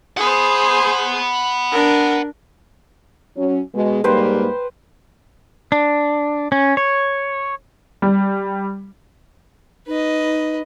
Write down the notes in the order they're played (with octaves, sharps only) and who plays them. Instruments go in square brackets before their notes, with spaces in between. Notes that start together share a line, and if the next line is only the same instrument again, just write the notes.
[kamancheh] G#4 C5 [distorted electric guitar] F#5 B5
[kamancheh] D4 A#4
[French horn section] F#3 C#4
B2 G#3
[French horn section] G#2 G3 A#3 [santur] B4 C5 G5
[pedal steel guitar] D4
C#4
C#5
[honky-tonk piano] G3
[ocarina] D#4 [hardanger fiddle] B4 D#5